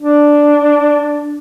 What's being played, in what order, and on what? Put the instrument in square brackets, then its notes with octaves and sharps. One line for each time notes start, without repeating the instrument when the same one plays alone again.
[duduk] D4